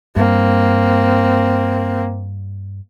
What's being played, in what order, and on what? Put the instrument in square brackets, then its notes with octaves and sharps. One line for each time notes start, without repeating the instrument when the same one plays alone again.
[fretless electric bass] G2 [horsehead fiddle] A#3 C4